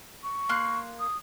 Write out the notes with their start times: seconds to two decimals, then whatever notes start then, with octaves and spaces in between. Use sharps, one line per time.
0.23 C#6
0.49 A#3 C6 F#6
1.00 D#6